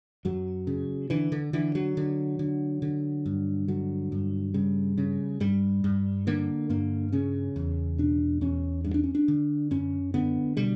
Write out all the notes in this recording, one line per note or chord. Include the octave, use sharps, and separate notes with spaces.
F#2 F#3
C#3
D3 E3
D3
D3 E3
F#3
D3
D3
D3
G2
D3 F#3
G2
C#3 G3
C#3
G2 G3
G2
D3 A#3
G2 A#3
C#3 C#4
E2
B2 D4
E2 C#4
G2
D4
C#4
D4
D3
F#2 C#4
D3 B3
B2 G3